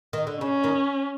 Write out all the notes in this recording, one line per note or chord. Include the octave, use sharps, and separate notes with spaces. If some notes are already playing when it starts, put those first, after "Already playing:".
D#3
D3
C#3 C#4
D#2 D#3